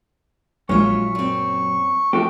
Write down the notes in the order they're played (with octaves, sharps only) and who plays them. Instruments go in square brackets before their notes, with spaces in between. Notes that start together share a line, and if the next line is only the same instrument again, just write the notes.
[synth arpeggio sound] A#1 [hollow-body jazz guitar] A#2 F#3 C#4 [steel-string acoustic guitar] G#3 F4 E5 [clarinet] C#6
[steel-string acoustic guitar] F#2 C4
[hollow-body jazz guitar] F3 G4 [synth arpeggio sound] A3 [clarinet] F#4